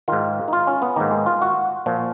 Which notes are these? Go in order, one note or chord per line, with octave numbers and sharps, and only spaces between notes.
G#2 D#3 F4
D#4
F4
C#4
B3
G#2 D#3 A#3
G#3
F4
F#4
A#2 F3